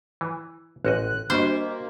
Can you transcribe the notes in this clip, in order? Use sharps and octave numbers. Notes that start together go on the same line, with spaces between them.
E3
A1 C#4 F#4 D#5 F#6
G3 A#3 D4 F#4 C5 D#5